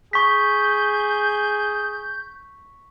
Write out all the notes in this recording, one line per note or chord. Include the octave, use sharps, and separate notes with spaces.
G#4 C#6 G6 B6